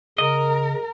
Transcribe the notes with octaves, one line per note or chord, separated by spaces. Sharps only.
C#3 A#4 D#5